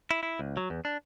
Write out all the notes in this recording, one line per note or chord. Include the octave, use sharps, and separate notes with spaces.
E4
E4
C#2
F#3
E2
D4